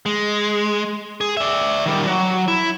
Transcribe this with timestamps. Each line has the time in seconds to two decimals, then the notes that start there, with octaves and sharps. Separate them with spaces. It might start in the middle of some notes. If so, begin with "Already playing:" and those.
0.06 G#3
1.21 G#4
1.37 D5 E5
1.86 D#3 G3
2.07 F#3
2.48 E4